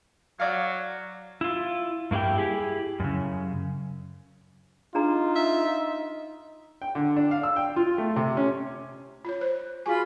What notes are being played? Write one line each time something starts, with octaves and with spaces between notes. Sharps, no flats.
F#3 D5 F5
E4 F4
G2 A#3 E4 G4 G5
E4 G4 G#4
F#2 C#3
D4 D#4 F4 G#4 A#5
E5
G5
D3
D4
F5
E6
G5
F4
A3
C3
C#4
F4 C#5
C5
F4 F#4 G#4 G#5 B5